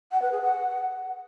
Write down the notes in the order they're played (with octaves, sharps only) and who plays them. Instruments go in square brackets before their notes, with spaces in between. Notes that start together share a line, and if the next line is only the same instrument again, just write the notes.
[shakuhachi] F#5
B4
G#4
F#5